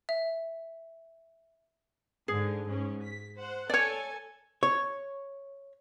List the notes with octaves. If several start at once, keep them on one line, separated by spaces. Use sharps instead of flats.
E5
G#2 D3 G#4
G#2 C#4
B6
C5 F#5
A4 C#5 D5 G#5
C#5